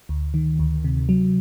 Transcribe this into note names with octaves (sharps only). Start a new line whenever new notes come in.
D2
D#3
D2
C3
F#3